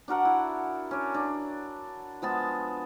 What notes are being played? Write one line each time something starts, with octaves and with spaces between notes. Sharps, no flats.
D4 F#4 A#4 F#5
E4
C#4 D4
D4
F3 G#3 B3 A5